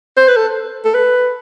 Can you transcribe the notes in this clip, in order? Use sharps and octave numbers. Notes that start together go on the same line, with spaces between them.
C5
B4
A4
A4
B4